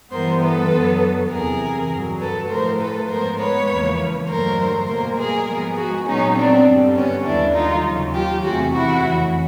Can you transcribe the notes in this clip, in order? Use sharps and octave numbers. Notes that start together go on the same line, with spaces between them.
G2 E3 G3 B3 A#4 C5
A4 B4
F#2 D3 F#3 B3
E2 C3 E3 G#4 A#4
G2 D3 F#3
A4 B4
A2 F3 A3 A#4 C5
A4 B4
G#2 F3 G#3 B3 A#4 C5
B4 C#5
E2 C#3 F3 A#3
G2 D3 F#3 A3 A#4 C5
B2 G3 A#3 A#4 C5
G#4 A#4
G#2 F3 G#3 B3
F#4 G#4
A#2 F#3 B3 C#4 D#4
C4 D4
G2 D3 G3
B3 C#4
D#2 D3 G3 D4 E4
D#4 F4
D#2 C#3 F#3
F4 G4
E2 C3 E3 A3 F#4 G#4
E4 F#4
F2 C#3 E3